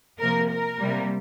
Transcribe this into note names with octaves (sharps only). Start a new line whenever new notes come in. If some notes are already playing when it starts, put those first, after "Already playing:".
C3 F3 A#3 A#4
A#4
C3 G3 A#3